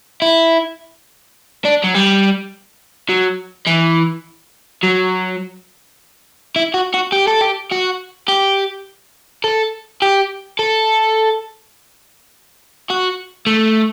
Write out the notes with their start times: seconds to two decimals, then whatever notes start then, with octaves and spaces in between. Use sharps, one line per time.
0.22 E4
1.65 D4
1.84 F#3
1.95 G3
3.09 F#3
3.67 E3
4.83 F#3
6.56 E4
6.74 F#4
6.94 F#4
7.13 G4
7.28 A4
7.41 G4
7.71 F#4
8.29 G4
9.44 A4
10.02 G4
10.59 A4
12.90 F#4
13.47 A3